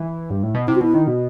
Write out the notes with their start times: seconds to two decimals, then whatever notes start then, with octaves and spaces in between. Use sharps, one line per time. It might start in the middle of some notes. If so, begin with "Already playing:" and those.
Already playing: E3
0.30 G2
0.43 A2
0.55 B2
0.67 C3 E4
0.75 F#4
0.80 B2 E4
0.94 D#3
1.07 B2